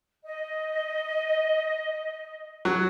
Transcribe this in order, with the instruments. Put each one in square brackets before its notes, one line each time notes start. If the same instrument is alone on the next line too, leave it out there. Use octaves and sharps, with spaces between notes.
[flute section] D#5
[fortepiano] F#3